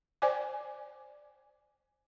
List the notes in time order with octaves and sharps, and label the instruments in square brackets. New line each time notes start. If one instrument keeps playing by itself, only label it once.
[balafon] C5 D5 G5 G#5 D6